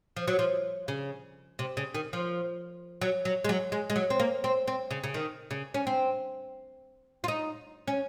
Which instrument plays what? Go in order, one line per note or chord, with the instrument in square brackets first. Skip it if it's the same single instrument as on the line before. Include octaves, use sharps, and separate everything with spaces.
[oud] F3
F#3
F3
C#3
C3
C#3
D#3
F3
F#3
F#3
G#3
F#3
G#3
G#3
F#3
C4
A#3
C4
C4
C#3
C#3
D#3
C#3
C#4
C4
F4
D#4
C#4